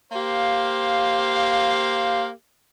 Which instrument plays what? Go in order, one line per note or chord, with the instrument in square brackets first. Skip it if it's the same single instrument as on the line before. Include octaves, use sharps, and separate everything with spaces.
[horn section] A#3 G4 C5 F5